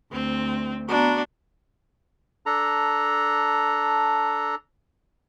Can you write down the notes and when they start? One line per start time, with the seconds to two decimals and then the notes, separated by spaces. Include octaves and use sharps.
0.12 D2 C4
0.89 B3 D4 F#4 A#5
2.46 D4 A4 A#5